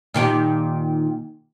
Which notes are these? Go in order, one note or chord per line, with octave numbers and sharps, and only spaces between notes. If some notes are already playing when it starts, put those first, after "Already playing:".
A#2 D#3 G4